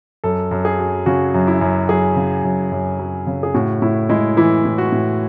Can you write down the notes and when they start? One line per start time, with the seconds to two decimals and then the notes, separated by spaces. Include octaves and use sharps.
0.24 F#2 A4
0.51 F#2
0.65 G#4
0.79 F#3
1.06 C#3 F#4
1.34 F#2
1.47 E4
1.61 F#2
1.89 F#3 G#4
2.16 C#3
2.44 F#2
2.72 F#2
2.99 F#3
3.27 C#3
3.43 G#4
3.54 A2 F#4
3.82 A2 E4
4.09 G#3 E4
4.37 E3 E4
4.65 A2
4.78 F#4
4.92 A2